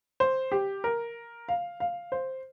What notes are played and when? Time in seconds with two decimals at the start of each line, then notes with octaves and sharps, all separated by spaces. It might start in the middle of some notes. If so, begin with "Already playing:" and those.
0.20 C5
0.52 G4
0.84 A#4
1.49 F5
1.80 F5
2.12 C5